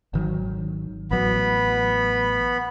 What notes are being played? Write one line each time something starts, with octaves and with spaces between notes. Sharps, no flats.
G#1 D#3 F#3
A1 F#3 B3 B5